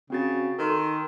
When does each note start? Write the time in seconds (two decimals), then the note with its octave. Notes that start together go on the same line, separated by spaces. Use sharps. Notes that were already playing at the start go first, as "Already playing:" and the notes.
0.10 C#3 C4 F#4 A6
0.59 D#3 A4 A#4 C6